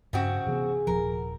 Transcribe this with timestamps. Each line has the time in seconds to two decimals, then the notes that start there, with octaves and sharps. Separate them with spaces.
0.13 G2 C#3 C4 F#4
0.47 C3 E3 B3 G#4
0.87 D#1 F3 A#4